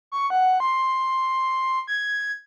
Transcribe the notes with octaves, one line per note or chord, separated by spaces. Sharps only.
C#6
F#5
C6
G#6